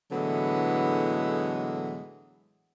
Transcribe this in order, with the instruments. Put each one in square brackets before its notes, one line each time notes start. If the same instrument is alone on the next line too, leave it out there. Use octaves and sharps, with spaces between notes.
[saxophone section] A2 D3 E3 F#3 G#3 B3